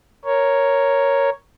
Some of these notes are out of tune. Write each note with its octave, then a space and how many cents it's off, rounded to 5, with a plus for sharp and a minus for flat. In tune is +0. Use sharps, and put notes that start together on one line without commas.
A#4 +0 C#5 +0